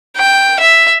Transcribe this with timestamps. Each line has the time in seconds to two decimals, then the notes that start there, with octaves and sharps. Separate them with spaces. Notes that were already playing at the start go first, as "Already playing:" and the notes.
0.17 G5
0.60 E5